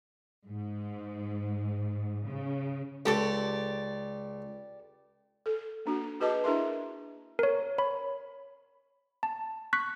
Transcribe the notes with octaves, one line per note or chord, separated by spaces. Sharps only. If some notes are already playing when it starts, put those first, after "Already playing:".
G#2
C#3
C#2 G4 A4 D5
A4
A#3 D4 F#4
F#4 G#4 B4 D#5 A5 D6
D4 E4 G#4 A#4 E5 C6
A#4 C#5
C#5 B5
A5
C#6 F#6 B6